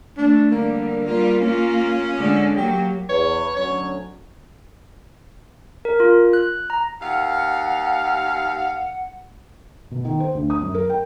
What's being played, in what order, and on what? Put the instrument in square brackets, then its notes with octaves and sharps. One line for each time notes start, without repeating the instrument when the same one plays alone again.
[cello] A3 [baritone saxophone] D4
[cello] D3 G3 [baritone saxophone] A#3
[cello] G3 F4 [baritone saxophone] A#3
[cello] A#3 F4 [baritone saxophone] C#4
[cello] D3 G#3
[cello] F#3 A#3 [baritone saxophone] G4
[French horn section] E2 B4 [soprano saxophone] C#5
[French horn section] D2 F#3 C#4 [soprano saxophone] C#5
[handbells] A#4
F4
F#6
A#5
[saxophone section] D#2 F5 [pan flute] F#5
[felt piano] B2
D#3
C5
D2
D#6
F#2
A#4
G5